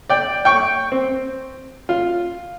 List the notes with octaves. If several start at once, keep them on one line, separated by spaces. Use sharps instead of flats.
D5 G5
G5 C#6
C4
F4